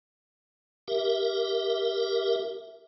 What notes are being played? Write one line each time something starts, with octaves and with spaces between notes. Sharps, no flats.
G4 A#4 E5